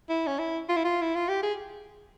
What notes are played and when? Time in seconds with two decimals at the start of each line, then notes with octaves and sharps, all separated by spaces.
0.10 E4
0.27 C#4
0.39 E4
0.69 F4
0.77 E4
0.85 F4
1.02 E4
1.15 F4
1.28 G4
1.43 G#4